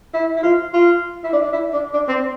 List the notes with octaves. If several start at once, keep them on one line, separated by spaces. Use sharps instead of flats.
E4
E4
F4
F4
E4
D4
D4
E4
D4
D4
C4